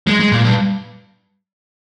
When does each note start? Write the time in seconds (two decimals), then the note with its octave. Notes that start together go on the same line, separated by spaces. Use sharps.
0.07 G#3
0.20 G#3
0.32 A#2
0.44 G2